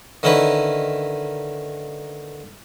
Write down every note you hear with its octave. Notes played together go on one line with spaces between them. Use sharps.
D3 D#3 C#4 D#4 E4 B4